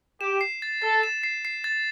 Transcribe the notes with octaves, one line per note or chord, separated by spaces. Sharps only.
G4 E7
C7
A6
A4 A6
E7
C7
C7
A6